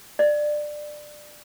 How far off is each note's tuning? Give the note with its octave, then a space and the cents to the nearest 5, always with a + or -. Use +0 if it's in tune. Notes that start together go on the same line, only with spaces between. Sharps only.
D5 +20